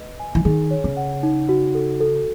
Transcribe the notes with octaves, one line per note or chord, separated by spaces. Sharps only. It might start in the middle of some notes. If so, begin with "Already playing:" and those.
Already playing: B4 D#5
G#5
E3
D#3 G#4
C#5
C#3
F#5
D#4
F#4
A4
A4